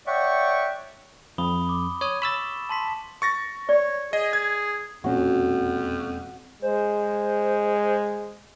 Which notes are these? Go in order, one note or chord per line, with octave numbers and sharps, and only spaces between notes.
C#5 D5 E5 F#5 G5 C#6
F2 B5 D#6 G7
D6
C#5 D#6
B5 C#6 E6 A6 E7 G7
A5 C6 B6
C#6 A6 A#6
C#5 D5
G#4 D#5
G#6
E1 F2 A#2 C#4 F#4
G#3 C5